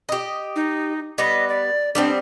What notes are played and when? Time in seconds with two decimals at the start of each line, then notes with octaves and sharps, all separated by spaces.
0.09 G4 D#5
0.56 D#4
1.18 G3 B3 B4 D#5
1.49 D5
1.95 G3 B3 C4 D4